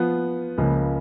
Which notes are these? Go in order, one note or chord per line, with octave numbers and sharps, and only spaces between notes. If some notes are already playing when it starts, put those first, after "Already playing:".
Already playing: F3 B3 F4
C#2 C#3 F3 A#3